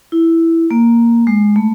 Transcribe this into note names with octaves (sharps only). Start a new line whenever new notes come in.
E4
A#3
G#3
A3